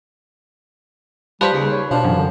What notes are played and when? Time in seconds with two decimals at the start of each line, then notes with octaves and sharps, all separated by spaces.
1.41 F3 G3 G4 B4 C5 B5
1.53 D#2 C#3
1.71 C#5
1.91 B2 F3 D4
2.05 F#2 E3
2.17 D3